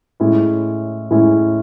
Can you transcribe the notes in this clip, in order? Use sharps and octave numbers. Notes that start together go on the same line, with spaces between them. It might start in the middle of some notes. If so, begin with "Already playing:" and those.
A2 G#3 C#4 E4
A2 G#3 C#4 E4